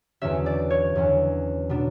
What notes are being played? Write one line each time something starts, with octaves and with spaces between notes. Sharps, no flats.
E2 D3 F#3 C#4 E5
D5
C#5
E2 D3 F#3 C#4
B2 F#3 B3 D4